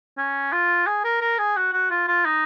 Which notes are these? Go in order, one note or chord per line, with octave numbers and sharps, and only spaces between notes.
C#4
F4
G#4
A#4
A#4
G#4
F#4
F#4
F4
F4
D#4